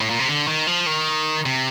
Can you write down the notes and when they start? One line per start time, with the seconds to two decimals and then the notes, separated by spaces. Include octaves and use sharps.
0.01 A2
0.10 A#2
0.19 C3
0.28 D3
0.48 D#3
0.67 F3
0.86 D#3
1.46 C3